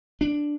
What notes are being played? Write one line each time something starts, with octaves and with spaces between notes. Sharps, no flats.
D4